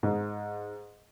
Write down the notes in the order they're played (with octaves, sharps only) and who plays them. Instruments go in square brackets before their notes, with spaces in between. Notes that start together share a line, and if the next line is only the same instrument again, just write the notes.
[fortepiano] G#2